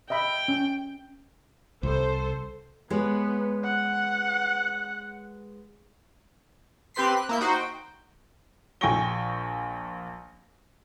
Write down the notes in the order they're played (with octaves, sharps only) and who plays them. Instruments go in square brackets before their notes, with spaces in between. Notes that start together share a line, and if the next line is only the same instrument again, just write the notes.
[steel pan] D#5 E5 B5 [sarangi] G5
[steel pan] C#4
[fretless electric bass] C2 [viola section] A4 C5
[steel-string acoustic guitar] G#3 B4 C#5 [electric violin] B3
[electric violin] F#5
[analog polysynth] C4 G4 B4 C6 B6 C7
F#6
A#3 E4 G6
D#4 F#4 C5
G5
[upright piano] A#1 G5 G#5 C#6 A#6 G7